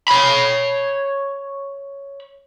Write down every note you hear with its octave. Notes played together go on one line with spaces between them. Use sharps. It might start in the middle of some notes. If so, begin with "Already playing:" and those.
C#5 B5